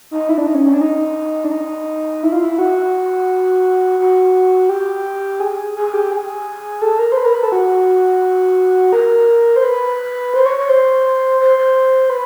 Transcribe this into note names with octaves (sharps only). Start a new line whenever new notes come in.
D#4
E4
D4
D#4
C#4
C#4
D4
D#4
D4
D#4
E4
F4
E4
F#4
F#4
G4
G#4
G#4
G4
G#4
A4
A#4
C5
B4
A#4
B4
A4
F#4
A#4
C5
B4
C5
C#5
C#5
C5
C5
C5
B4